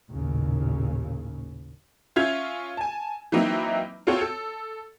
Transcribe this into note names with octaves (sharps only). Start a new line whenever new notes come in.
A1 D#2 A#2 C#3
C#4 F4 E5 G#6 F7
G#5 A5
E3 F#3 A#3 C4 D#4 E4
C4 F4 F#4 A4 C5 C#5
A4